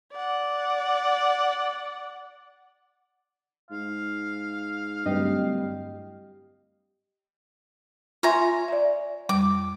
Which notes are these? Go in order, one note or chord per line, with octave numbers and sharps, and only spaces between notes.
D5 F#5
G#2 F5
D1 G2 G4 D#5
F4 C#5 E5 G#5 A#5 C6
D5 E5
F2 G3 D6